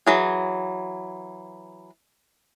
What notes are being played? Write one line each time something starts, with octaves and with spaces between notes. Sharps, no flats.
E3 F#3 G#4